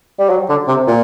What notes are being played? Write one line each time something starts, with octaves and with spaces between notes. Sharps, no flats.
G3
F#3
D3
C3
A#2